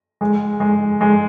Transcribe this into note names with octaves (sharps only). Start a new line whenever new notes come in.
G#3
G#3
G#3